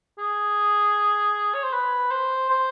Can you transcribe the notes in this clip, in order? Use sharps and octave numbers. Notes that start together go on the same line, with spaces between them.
G#4
C#5
C5
B4
C5
C5